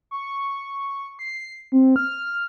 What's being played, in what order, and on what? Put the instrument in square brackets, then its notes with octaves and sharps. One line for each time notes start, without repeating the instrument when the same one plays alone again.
[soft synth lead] C#6
C7
C4
F6